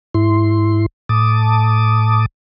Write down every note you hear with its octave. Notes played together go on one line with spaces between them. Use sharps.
G#2 E4 C6
A2 A5 D6 D#6